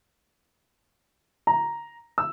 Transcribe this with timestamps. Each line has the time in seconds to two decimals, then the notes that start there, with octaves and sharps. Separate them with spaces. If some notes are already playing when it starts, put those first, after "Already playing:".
1.47 A#5
2.18 E6